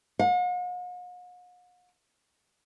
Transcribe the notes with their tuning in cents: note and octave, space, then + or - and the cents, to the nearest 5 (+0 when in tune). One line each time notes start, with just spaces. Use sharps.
F#5 -45